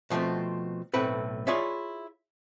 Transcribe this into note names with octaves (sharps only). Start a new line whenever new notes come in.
B2 F3 G#3 A3 C4
B1 A2 A3 C4 B4
E4 F4 G#4 C#5 D5 E5